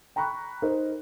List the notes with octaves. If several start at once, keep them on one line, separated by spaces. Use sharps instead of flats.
G5 A#5 B5 C#6 F#6
D#4 A#4 C5